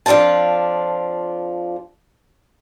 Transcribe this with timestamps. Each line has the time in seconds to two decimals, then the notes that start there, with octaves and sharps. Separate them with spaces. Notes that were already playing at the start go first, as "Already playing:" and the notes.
0.06 F2 F3 D4 F4 A5